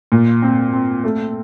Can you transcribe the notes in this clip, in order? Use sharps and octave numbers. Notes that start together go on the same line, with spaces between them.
A#2
C4
C4
A3